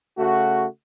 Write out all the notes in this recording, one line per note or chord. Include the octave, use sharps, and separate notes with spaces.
C#3 A3 F#4